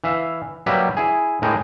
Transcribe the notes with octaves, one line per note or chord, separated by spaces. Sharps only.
E3 E5 F5
F#3 G3 A#3 G4 B4 E5
E4 G#4
A2 G#3 A#4 G5 G#5